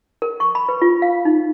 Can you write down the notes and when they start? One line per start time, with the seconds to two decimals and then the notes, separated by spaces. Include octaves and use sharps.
0.22 A#4
0.40 C#6
0.55 B5
0.69 B4
0.82 F4
1.02 F5
1.25 D#4